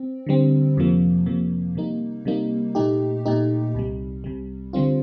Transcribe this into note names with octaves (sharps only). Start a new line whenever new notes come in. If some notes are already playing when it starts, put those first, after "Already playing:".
Already playing: C4
D3 G3 C4
F2 C3 F3 A#3
F2 C3 F3 A#3
C3 G3 A#3 D#4
C3 G3 A#3 D#4
A#2 A3 D#4 G4
A#2 A3 D#4 G4
C2 C3 G3
C2 C3 G3
D3 G3 C4 F4